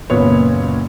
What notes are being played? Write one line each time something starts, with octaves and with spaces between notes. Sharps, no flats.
F#1 A#2 B3 C#5